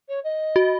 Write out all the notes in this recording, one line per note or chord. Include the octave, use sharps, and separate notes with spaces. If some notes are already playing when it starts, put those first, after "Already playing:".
C#5
D#5
F#4